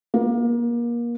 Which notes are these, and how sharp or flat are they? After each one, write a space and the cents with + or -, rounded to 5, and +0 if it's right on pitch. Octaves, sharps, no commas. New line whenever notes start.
A#3 +30